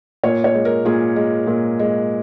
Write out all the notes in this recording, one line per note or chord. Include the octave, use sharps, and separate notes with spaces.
A#2 C#5
C#5
G#3
A#4
A#2 G#4
G#3
A#2
G#3